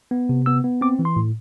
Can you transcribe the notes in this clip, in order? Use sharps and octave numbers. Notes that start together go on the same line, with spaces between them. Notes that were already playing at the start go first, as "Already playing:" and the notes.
B3
C3
B3 E6
B3
C4 D6
E3
C6
A2